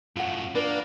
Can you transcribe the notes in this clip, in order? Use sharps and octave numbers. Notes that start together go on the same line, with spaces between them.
F#2 A2 F4 F#5
A#3 D4 A#4 B4